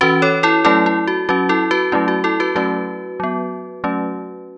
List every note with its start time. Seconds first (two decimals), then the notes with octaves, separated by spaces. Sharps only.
0.01 E3 C#4 F#4 B4
0.22 A4 C#5
0.43 E4 A4
0.65 F#3 A3 C#4 E4 A4
0.86 E4
1.08 F#4
1.29 F#3 C#4 F#4
1.49 E4 A4
1.71 F#4 B4
1.92 F#3 A3 C#4 E4
2.08 F#4
2.24 E4 A4
2.40 F#4 B4
2.55 F#3 A3 C#4 F#4 B4
3.20 F#3 B3
3.84 F#3 A3 C#4